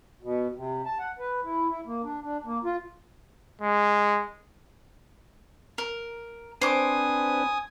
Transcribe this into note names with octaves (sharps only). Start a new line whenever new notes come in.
B2
C3
A5
F#5
B4
E4
E4
A#3
D4
D4
A#3
F4
G#3
A#4
C4 D4 B4 C5 G#5 D6 D#6